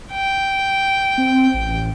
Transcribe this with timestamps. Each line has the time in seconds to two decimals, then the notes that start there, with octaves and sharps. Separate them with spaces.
0.12 G5
1.18 C4
1.54 A1